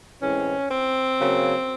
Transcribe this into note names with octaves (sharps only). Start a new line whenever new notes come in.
A2 E3 G#3 C4 C#4
C4
C#3 F#3 A#3